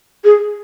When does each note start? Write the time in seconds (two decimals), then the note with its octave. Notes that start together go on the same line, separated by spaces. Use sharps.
0.24 G#4